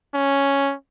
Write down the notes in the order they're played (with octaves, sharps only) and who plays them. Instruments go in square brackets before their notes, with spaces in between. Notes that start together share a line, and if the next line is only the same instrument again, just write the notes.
[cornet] C#4